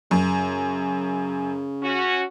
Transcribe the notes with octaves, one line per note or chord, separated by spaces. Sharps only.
F#2 C#3
C#4 F#4